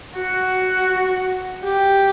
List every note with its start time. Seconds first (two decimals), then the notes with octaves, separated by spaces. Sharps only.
0.16 F#4
1.64 G4